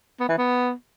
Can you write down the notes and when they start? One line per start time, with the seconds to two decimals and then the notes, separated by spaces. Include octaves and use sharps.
0.20 B3
0.29 E3
0.38 B3